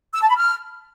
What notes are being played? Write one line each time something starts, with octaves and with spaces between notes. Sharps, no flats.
E6
A5
B5
F6